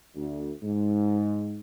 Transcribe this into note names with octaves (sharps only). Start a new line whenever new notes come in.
D2
G#2